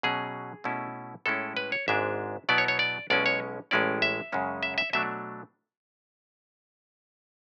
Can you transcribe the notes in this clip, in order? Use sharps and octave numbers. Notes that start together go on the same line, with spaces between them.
B2 F#3 C#4 G#4
B2 A3 C#4 E4
A2 G#3 C#4 E4 A4
B4
C#5
G#1 G#2 G#3 D4 E5
B2 F#3 B3 E4 D5
C#5
C#5
D5
B1 B2 G#3 C#4 E4 D5
C#5
A1 A2 G#3 C#4 E4 D5
E5
F#2 C#3 G#3 C#4
E5
E5
B2 F#3 A3 D4 E5